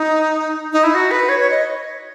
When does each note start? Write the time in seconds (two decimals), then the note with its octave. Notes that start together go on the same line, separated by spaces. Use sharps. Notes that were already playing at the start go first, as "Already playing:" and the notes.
Already playing: D#4
0.73 D#4
0.83 E4
0.94 F#4
1.11 B4
1.29 C#5
1.40 C#5
1.51 D#5